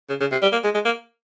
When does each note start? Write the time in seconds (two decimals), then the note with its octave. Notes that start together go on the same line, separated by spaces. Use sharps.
0.09 C#3
0.21 C#3
0.32 C3
0.42 G3
0.53 A#3
0.64 G#3
0.75 G#3
0.85 A#3